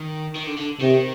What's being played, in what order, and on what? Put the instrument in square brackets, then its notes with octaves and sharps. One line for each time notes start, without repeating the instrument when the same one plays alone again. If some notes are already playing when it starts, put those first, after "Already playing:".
Already playing: [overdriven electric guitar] D#3
D#3
D3
D3
[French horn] C3 [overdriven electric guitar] D#3